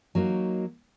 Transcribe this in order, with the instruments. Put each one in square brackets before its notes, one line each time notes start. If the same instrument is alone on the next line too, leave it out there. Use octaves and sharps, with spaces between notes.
[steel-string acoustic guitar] F#3 A#3 D#4 F#4